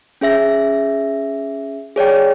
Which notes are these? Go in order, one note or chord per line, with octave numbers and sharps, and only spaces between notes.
C#4 G#4 E5 A#6
G#4 C#5 D5 G5